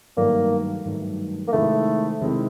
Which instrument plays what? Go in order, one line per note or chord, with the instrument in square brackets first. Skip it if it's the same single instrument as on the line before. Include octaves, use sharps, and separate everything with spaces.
[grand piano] G2 D#3 F#3 A3 [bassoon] A#3
[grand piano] G2 D#3 F#3 A3
[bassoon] A#3
[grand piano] C3 D#3 G#3 C4 E4 [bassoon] A3
[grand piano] C3 D#3 G#3 C4 E4